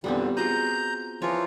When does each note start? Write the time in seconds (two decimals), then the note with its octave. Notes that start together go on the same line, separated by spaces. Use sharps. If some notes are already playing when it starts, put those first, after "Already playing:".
0.04 E2 A#2 D3 G3 B3 C4
0.37 F4 F#4 G#4 A#5 G6
1.22 E3 F3 F4 A#4 C#5